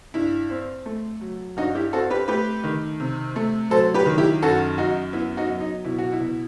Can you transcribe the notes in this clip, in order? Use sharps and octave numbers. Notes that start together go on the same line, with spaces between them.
G2 E4
C4
A3
F#3
G2 D#4 F#4
E4 G4
C4 F#4 A4
G4 B4
A3 G4 B4
D#3
C3
A3
F#3 A4 C5
G4 B4
D#3
E4 G4
F#2 F#4 A4
F#2 D#4 F#4
B3 E4
D#4 F#4
F#3
D#4
B2 E4
F#4
E4
B2